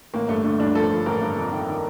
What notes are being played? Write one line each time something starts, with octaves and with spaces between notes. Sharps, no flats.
A1 A#3
G2 A3
D3 A3
G2 D4
F3 A4
F3
A1 A#4
G2
F2
D#3
D#3